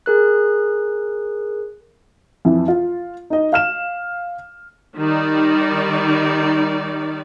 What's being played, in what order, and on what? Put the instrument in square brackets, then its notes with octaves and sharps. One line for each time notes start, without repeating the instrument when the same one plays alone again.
[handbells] G#4 A#4 F#6
[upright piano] F2 E3
F4
D#4 D#5
F5 F6 E7
[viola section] D#3 G3 D#4 D5